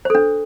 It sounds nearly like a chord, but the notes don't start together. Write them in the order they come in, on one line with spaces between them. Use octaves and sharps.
C5 A4 D4